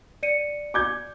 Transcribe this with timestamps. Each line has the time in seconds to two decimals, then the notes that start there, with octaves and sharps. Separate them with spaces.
0.23 D5 C#7 D#7
0.74 D6 G6 G#6